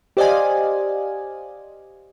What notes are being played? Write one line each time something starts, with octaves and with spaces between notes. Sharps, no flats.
G4 C5 D5 D#5 F5 G#5